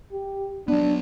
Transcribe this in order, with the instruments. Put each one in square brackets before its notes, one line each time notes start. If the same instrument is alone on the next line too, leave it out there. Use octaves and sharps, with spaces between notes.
[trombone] G4
[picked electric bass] F#3 B3 [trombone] D4